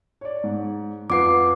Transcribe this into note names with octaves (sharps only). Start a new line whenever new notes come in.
C#5 D5
G#2
F2 F4 B4 F#5 D6 C7